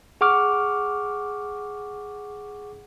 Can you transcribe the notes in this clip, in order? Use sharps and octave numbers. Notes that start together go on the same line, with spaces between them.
G#4 F#5 C#6 D6 F6